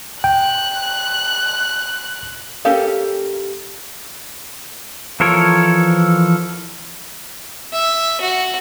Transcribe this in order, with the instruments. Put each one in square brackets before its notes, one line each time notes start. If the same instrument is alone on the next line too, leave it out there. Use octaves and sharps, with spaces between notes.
[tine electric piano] G5 [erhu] F#6
[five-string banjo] A#3 C#4 G4 A4 F5
[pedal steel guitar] E3 F3 A4 A#4 C#5
[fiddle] E5
F#4